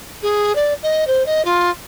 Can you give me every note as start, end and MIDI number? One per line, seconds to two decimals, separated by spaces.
0.22 0.54 68
0.55 0.73 74
0.83 1.06 75
1.07 1.25 72
1.26 1.44 75
1.44 1.69 65